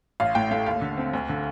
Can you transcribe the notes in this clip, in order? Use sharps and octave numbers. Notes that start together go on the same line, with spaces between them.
A1 F5
A2 G5
A3 F5
D#2 F5
D3
C4
D2
D3